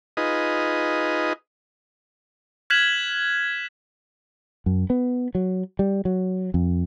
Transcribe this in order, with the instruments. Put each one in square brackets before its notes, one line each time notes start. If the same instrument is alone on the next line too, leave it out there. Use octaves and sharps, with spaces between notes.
[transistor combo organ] D#4 F4 G#4 B4 D#5
[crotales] F6 F#6 G#6 B6 E7 F#7
[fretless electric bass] F#2
B3
F#3
G3
F#3
F2